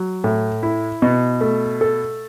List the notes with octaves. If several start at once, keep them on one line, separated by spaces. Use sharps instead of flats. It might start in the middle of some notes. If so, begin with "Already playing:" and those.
Already playing: F#3
A2
E4
B2
A3
A4